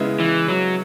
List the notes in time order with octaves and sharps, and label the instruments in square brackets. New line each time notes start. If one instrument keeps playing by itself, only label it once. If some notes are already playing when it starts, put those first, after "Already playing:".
Already playing: [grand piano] C#3 G#3 B3 E4
[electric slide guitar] E3
F#3